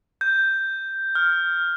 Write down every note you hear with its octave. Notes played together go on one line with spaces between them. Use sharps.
G6
F6